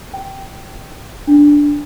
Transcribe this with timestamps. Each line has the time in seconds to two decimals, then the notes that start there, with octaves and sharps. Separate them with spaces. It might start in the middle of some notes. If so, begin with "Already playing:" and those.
0.14 G5
1.27 D4